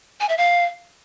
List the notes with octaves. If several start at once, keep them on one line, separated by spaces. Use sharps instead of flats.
G#5
E5
F5